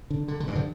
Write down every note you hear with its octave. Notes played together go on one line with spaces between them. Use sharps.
D3
D3
D3
G2 E3
D3 F3